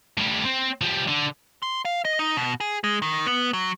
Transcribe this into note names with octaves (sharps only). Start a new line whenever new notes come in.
A2 G3
C4
F3 G3
D3
C6
F5
D#5
D#4
B2
G#4
G#3
D#3
B3
F#3